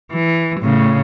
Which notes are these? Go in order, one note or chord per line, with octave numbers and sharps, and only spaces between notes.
E3
A2 C#3